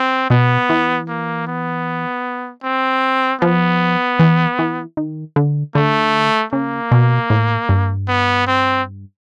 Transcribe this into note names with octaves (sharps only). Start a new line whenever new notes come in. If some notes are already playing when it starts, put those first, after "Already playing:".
Already playing: C4
B2 B3
E3
A#3
B3
C4
F3 B3
E3
E3
D#3
D3
D3 A3
C#3 A#3
B2
A2
G2
B3
C4